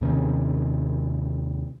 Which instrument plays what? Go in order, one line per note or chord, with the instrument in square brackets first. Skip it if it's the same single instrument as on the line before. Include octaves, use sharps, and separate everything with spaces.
[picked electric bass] D#2 C3 D#3 C#4